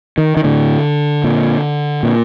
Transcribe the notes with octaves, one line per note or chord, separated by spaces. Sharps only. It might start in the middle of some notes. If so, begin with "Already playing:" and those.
D#3
D#3
A2 D3
A#2
A#2